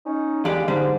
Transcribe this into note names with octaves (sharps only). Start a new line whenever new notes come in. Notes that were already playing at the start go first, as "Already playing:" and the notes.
C#4 D#4
E2 D3 G#3 D4 G4 F5
G#2 D3 G3 D4